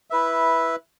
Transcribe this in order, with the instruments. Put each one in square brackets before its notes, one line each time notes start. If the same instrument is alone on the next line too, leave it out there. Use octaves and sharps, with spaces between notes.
[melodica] E4 B4 E5